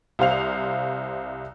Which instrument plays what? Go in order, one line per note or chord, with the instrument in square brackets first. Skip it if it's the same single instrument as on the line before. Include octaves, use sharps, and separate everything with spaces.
[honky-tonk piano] C2 C5 F5 F7